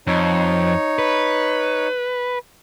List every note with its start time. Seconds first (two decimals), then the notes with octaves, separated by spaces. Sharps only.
0.07 F2 D#4 C#5
0.99 B4